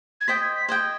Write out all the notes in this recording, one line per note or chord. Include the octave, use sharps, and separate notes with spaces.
G#6
C5 D#5 G5 B6
G#6
B6
C5 D#5 G5 G#6